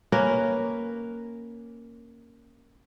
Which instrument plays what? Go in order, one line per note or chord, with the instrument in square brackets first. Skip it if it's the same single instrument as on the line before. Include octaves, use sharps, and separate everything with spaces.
[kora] A#3 C#4 A#4 B4